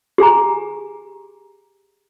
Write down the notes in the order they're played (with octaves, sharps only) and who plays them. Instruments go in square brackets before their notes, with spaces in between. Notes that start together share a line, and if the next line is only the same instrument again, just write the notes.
[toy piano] G4 G#4 G#5 A#5